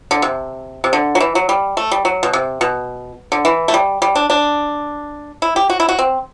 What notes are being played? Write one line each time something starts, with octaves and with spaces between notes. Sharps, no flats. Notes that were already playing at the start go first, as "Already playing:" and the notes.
D3
C3
C3
D3
F#3
E3
F#3
G3
A3
G3
F#3
B2
C3
B2
D3
E3
A3
G3
G3
D4
D4
E4
G4
F#4
E4
F#4
C4